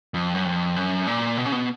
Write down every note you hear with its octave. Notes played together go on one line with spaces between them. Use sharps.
F2
F#2
F2
F#2
A#2
B2
C#3
B2